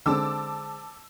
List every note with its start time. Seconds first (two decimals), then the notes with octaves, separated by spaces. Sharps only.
0.06 D3 G#3 C4 A5 D6 E6